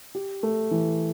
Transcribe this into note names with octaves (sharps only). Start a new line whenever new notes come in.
G4
A3
E3